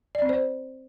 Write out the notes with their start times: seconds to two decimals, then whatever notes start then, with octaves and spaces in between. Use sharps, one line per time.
0.15 D5
0.22 C4
0.29 C5